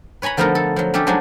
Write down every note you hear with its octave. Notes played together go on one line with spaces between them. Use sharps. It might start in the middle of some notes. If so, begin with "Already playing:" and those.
B4 C#5 G#5 A#5 B5
D3 F3 A3 B3 D#4 A#4
A4
F3 F#3
A3 C#4 D4 G4 A4
F3 F#3 G#3 D4 D#4 G#5